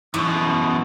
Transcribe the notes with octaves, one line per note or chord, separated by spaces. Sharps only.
F#2 B2 E3 G#3 C#6 D#6